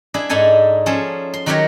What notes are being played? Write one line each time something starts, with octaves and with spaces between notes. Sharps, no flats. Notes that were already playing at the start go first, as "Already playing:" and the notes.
D4 E4 G#4
G#2 D4 D#4 A4 G#5
F3 C#4 G#4 A4
C6
D#3 F#3 F#4 G4 A#4 C#5